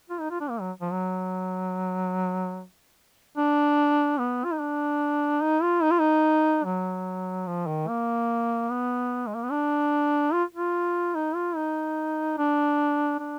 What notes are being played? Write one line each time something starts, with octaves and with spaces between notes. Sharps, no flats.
F4
D#4
F4
D4
A#3
F#3
F3
F#3
D4
B3
F4
D#4
D4
D#4
F4
D#4
F4
D#4
F#3
F3
D#3
A#3
B3
G#3
A#3
B3
D4
F4
F4
D#4
F4
D#4
D4
D4